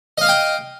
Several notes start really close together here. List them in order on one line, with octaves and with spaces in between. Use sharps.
D#5 F5 D#6 G5